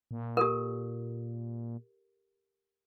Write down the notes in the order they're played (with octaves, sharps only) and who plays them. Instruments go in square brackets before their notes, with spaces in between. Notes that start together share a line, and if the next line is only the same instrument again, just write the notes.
[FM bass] A#2
[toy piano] G4 A4 A#4